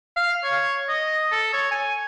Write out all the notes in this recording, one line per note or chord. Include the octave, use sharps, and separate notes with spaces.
F5
C#5
D#5
A4
C#5
G#5